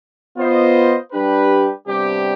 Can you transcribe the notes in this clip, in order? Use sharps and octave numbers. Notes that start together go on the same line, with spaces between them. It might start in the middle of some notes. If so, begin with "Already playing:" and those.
B3 F4 C5 D#5
G3 D4 G4 B4
C3 G3 B3 D4 G4